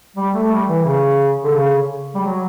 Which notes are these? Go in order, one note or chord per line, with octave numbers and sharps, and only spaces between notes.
G3
A3
G3
E3
C#3
D3
C#3
G3
F#3